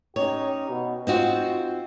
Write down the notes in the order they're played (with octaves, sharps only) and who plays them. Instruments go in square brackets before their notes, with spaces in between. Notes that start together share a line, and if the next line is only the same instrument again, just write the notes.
[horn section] C#4 D#4 G4 [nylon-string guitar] C#5
[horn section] B2
[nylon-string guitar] C4 D#4 F#4 [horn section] F4